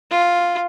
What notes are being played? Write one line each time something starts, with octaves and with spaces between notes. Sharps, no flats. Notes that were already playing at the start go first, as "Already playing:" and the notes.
F4